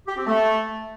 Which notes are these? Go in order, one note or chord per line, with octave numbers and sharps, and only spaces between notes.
G4
C4
A3